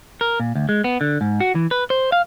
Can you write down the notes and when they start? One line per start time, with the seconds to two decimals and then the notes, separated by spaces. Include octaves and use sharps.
0.21 A#4
0.40 A#2
0.56 D2
0.69 G#3
0.84 B3
1.01 D3
1.21 G#2
1.40 F#4
1.55 E3
1.71 B4
1.90 C5
2.12 F5